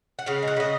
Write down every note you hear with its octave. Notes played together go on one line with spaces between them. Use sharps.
F#5
C#3 F5
G#3
F#5
C#3 D#5